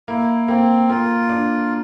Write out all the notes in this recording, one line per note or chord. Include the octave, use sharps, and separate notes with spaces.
A#3 E4
A#3 C4
A#3 F4
D4